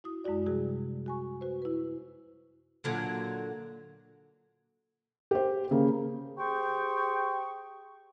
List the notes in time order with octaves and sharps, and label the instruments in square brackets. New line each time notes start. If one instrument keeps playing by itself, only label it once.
[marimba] E4 F#4 D#6
F#2 G#3 E4 F#4 D5
C3 F3 G3 F#4 G#4
F#4 G#5 C#6
F#4 B4 C5
E4 B4
[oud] A#2 D3 F#3
[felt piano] G4 C5
C#3 A#3
[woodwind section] G4 G#4 C5 G5 C#6